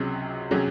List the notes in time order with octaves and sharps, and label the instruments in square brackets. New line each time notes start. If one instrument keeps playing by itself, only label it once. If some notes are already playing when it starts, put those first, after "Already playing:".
Already playing: [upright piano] C#2 C3 F#3 C#4 G#4
C3 F#3 C#4 G#4